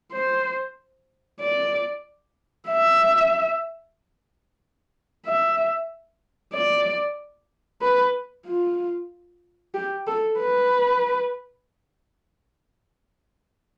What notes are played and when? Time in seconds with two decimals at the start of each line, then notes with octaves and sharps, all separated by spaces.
0.12 C5
1.40 D5
2.69 E5
5.26 E5
6.53 D5
7.82 B4
8.47 F4
9.74 G4
10.07 A4
10.39 B4